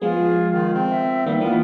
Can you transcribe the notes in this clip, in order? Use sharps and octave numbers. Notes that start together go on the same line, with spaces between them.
F3 G#3 B3 F4 G#4
D#3
C4
E5
D#3 G3 A#3 B3
E3 A#3 B3 F4